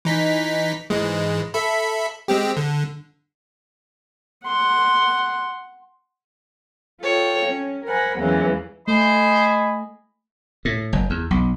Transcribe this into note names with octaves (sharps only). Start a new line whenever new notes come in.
E3 D#4 B6
G#2 E3 G#3
A4 E5 B5
G#3 C4 G4
D3
F#5 C6
F4 A4 C#5 G5
C#4
A#4 C5 F#5 G#5 B5
E2 E3 F#3 G#3 A#3 C#4
A3 C5 D#5 G#5 B5
A2
F#1
E2
B1